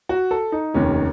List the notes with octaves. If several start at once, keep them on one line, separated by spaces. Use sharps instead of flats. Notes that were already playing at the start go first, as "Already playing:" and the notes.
F#4
A4
D#4
F1 D#2 D#3 C#4